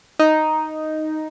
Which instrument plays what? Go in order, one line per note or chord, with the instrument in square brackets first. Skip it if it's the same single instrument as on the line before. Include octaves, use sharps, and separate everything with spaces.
[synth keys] D#4